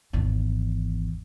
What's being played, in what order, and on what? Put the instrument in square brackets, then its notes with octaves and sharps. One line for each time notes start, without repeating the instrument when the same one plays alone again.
[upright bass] G#1 E2